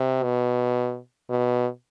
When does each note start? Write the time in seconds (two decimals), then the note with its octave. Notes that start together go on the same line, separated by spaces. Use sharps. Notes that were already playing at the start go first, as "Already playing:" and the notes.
Already playing: C3
0.23 B2
1.30 B2